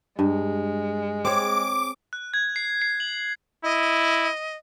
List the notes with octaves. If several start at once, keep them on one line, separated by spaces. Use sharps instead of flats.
G2 G#3
C4 G#4 C#5 D6
F#6
G#6
C7
C7
F#7
E4 D#5